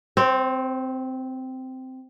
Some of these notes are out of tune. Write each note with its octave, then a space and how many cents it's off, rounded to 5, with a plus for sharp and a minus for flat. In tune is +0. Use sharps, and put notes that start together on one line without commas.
C4 -10 C5 +45